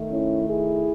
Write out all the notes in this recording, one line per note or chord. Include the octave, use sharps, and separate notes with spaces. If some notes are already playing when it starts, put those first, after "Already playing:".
Already playing: D#3 A3
C#4 E4
E4 G#4